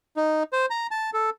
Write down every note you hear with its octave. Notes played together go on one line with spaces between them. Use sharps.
D#4
C5
A#5
A5
A4